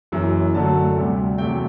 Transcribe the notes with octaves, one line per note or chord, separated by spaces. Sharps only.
F#1 F#2 E3
F#2 D3 F#3 A3 A5
D2 C3 G3
E2 C3 F#3 A3 G5